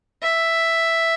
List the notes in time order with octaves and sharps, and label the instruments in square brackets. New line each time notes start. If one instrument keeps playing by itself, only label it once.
[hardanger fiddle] E5